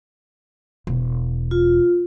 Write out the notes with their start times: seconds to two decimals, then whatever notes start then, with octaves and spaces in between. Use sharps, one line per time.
0.87 E1
1.51 F4